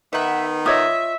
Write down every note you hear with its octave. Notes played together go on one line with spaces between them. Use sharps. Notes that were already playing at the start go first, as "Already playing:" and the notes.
D#3 B3 D#4 B4 E5 F#5
F4 C#5 D#5 E5 D#6